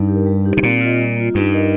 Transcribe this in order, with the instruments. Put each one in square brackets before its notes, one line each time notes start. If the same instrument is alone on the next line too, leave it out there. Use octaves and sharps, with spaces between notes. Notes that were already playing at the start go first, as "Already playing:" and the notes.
Already playing: [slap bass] G2 [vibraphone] D#4
[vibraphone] G4 A#4
G3
D#4 G4
[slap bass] C3
[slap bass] A#2 [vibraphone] C4
[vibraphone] F4 D#5
G3
A#3 F4
[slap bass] G2 [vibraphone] D#4
[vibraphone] A#4 D#5